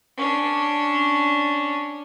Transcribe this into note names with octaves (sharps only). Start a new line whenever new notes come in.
C#4 D4